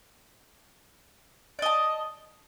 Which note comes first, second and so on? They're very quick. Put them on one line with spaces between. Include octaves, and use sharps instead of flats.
D5 D#5 A5